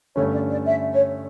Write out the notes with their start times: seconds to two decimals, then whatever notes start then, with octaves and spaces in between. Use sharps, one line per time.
0.15 G2 D3 A3 C#4 C#5
0.33 D5
0.49 D5
0.66 E5
0.93 C#5